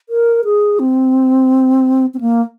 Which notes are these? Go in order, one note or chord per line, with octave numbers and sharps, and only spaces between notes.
A#4
G#4
C4
C4
A#3